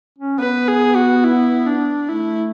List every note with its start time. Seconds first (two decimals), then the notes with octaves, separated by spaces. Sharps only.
0.19 C#4
0.39 B3 B4
0.68 G#4
0.96 F#4
1.24 E4
1.66 D4
2.09 A3 E4